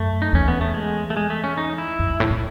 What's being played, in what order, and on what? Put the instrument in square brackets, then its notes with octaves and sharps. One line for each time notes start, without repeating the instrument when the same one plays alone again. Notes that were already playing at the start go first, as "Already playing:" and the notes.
Already playing: [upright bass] F#2 [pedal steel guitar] A3
[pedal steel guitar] D#4
[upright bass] E2 [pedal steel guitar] C#4
[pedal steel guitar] B3
A3
G#3
A3
G#3
A3
C#4
D#4
E4
[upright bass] F#2
F#2
A2
A2